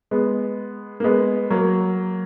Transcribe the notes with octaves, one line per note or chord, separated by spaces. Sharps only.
G#3 B3
A#3
G#3 B3
F#3 A#3